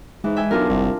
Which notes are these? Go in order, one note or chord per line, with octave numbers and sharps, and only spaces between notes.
G#2 E3 G#3
E5 G5 G#5
B1 D4 F4 A#4
F#1 C2